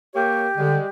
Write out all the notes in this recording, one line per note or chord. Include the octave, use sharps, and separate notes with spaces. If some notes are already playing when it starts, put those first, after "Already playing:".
A#3 G4 C#5
D3 G3 G#3